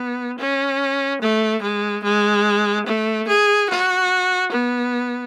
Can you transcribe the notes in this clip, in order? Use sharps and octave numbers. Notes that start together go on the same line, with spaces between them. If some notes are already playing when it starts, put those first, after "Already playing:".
Already playing: B3
C#4
A3
G#3
G#3
A3
G#4
F#4
B3